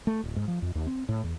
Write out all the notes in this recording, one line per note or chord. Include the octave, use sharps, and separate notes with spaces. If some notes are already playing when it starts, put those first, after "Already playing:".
A3
D1
G#2
F3
F2
D#2
C4
A2
E2